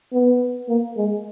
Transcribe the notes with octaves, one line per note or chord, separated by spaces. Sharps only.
B3
A#3
G#3